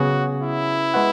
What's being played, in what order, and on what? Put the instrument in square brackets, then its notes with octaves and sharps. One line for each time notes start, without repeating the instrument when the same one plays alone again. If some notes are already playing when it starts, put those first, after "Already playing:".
Already playing: [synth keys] C#3 F#3 B3 G#4 [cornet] F#4
[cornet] E4
[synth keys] G#3 B3 F#4